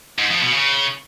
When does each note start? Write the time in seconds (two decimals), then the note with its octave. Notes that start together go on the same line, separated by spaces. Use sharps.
0.19 G#2
0.30 F2
0.42 B2
0.53 C#3